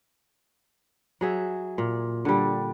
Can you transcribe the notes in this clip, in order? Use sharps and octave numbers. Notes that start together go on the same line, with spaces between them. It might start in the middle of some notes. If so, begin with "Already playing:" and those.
F#3 G#4 E5
A#2
D3 G3